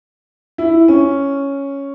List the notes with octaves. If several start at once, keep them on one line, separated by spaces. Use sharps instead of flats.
E4
C#4